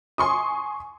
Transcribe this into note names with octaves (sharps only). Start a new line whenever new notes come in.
G#5 C6 C#6 D#6